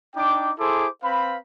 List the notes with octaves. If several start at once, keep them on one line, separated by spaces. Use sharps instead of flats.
D4 D#4 G5 D6
E4 G#4 A4 C5 C6 D6
C4 B4 F5 B5